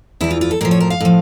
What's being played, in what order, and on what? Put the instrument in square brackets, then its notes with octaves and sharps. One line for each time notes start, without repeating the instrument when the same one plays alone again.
[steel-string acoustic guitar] E2 E3 E4
F4
F4
A4
A2 F3 A#4
C#5
A#4
F5
A2 F3